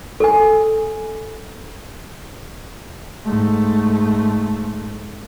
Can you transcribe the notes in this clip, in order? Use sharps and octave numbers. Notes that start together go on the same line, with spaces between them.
A4 G#5
G#2 A3